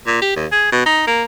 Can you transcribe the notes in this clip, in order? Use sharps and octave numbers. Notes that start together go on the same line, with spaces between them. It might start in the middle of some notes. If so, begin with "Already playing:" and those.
A#2
G4
D#2
G#4
B2
D#4
A#3